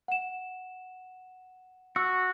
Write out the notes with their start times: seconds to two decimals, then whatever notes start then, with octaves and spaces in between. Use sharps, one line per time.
0.08 F#5 E7
1.96 F#4 E6